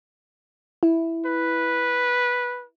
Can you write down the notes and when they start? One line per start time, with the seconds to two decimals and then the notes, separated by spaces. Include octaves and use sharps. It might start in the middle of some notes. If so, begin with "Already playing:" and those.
0.83 E4
1.26 B4